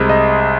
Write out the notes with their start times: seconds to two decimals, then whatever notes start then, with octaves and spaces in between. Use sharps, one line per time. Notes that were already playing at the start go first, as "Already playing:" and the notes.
Already playing: C2 C3 G#3
0.09 D#5